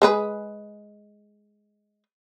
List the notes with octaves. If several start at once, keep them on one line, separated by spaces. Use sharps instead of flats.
G#3 G#4 B4